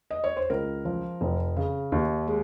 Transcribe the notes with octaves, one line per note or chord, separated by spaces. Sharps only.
D#5
C#5
C5
C#2 A#4
F3
F1
C#3
D#2
G#3